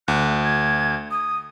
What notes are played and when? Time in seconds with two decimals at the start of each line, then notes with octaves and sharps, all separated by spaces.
0.08 D2 F#6
0.44 G#6
1.11 D#6